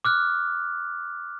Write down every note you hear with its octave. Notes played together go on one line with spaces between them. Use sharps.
D6 F6 F#6